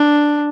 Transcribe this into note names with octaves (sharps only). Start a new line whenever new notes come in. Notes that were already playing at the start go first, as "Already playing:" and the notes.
Already playing: D4